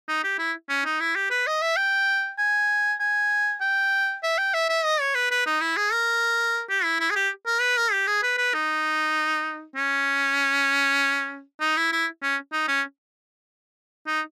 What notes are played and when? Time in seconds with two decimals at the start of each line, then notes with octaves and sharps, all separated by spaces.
0.08 D#4
0.24 G4
0.38 E4
0.69 C#4
0.85 D#4
1.00 E4
1.15 G4
1.30 B4
1.47 D#5
1.62 E5
1.76 G5
2.38 G#5
3.00 G#5
3.61 G5
4.23 E5
4.38 G5
4.54 E5
4.69 E5
4.84 D#5
5.00 C#5
5.15 B4
5.31 B4
5.46 D#4
5.61 E4
5.77 G#4
5.92 A#4
6.69 G4
6.84 E4
7.00 E4
7.10 G#4
7.16 G4
7.46 A#4
7.60 B4
7.77 A#4
7.92 G4
8.07 G#4
8.23 B4
8.38 B4
8.54 D#4
9.76 C#4
11.60 D#4
11.77 E4
11.92 E4
12.22 C#4
12.52 D#4
12.68 C#4
14.07 D#4